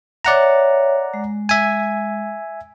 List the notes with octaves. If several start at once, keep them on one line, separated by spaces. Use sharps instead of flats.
C#5 D5 E5 F#5 A#5
G#3
E5 G#5